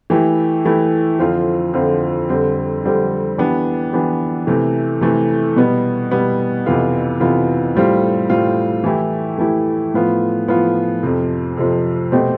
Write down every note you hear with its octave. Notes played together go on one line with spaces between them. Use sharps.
E3 A3 E4 G4
E3 A3 E4 G4
F2 D3 F3 C4 F4
F2 D3 F3 C4 F4
F2 D3 G3 C4
F2 D3 G3 C4
E3 B3 D4 G4
E3 B3 D4 G4
C3 E3 A3
C3 E3 A3
B2 G3 B3
B2 G3 B3
F2 C3 E3 B3 F4
F2 C3 E3 B3 F4
A2 G3 C4 F4
A2 G3 C4 F4
E3 A3 E4 G4
E3 A3 E4 G4
A2 F3 B3 F4
A2 F3 B3 F4
F2 C3 F3
F2 C3 F3
B2 A3 C4 G4